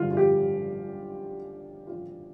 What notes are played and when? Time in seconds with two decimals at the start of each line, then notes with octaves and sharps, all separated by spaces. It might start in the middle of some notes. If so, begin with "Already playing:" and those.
Already playing: G2 D3 F3 F4
0.10 F4
0.17 G4
1.87 F4